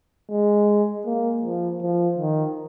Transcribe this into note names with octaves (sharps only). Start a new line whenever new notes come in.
G#3
A#3
F3
F3
D#3